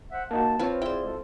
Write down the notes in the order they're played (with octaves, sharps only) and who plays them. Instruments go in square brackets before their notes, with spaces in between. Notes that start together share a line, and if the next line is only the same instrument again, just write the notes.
[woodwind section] C5 E5 F#5
[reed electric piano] A#3 D#4 F#4 [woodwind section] A5
[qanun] C4 F4 [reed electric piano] B4 C#5
[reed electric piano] E4 [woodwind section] G#4 D5 [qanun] C5 G5
[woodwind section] B2 G#3 A4